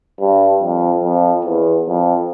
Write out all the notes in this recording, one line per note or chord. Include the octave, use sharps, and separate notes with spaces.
G2
F2
F2
E2
F2